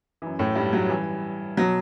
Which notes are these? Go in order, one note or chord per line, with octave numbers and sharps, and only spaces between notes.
F#2 E3
A2 A3
G2 G3
F#3
G2 E3
B2 F#3